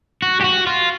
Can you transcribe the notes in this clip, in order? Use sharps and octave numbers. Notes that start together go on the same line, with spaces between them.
F#4
G4
F#4
F4